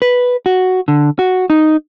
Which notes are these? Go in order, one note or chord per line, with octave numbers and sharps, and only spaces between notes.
B4
F#4
D3
F#4
D#4